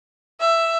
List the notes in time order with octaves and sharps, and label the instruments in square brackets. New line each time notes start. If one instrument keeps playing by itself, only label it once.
[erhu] E5